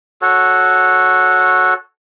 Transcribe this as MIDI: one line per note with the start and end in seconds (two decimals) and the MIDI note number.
0.22 1.74 66
0.22 1.74 69
0.22 1.74 73